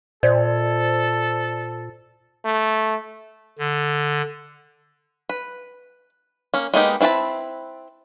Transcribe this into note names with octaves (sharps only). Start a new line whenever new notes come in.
A#2 A4 C5 D5
A3
D3
B4
A#3 C#4
G#3 A#3 B3 D#4 G4
C4 E4 B4 D5 A5